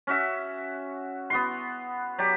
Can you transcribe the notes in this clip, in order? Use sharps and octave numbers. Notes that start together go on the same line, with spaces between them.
C#4 F#4 E5
B3 F#4 C6
F#3 G4 D5